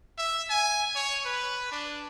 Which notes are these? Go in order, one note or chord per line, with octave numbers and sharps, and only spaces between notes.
E5
G#5
C#5
B4
D4